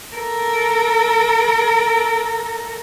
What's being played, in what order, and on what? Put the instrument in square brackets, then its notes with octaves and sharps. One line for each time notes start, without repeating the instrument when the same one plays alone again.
[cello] A4 A#4